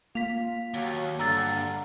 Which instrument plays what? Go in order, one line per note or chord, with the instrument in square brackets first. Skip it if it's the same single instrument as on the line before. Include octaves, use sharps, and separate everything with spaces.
[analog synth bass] A#3 [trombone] F4 [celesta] B6 F7
[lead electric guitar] D#2 [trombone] F#3
[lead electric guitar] G2 [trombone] D3 [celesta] A#5 E6 A6